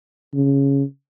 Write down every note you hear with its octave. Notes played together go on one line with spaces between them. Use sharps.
C#3